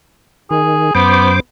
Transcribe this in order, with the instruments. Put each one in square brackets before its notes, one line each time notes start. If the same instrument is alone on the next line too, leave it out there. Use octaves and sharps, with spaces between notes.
[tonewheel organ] D#3 [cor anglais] G#4
[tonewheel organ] F#2 C5 D6 [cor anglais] B3